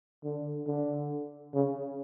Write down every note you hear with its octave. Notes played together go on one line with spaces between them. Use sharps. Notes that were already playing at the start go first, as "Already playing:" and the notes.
D3
D3
C#3